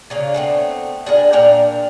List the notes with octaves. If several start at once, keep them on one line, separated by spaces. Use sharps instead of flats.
C#3 A#3 D4
A3 B3 C4
D4 G#4 A#4
A#2 D4 A#4 G5